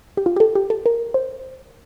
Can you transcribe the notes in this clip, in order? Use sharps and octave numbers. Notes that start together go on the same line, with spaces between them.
G4
F4
G4
A4
G4
A4
A#4
C5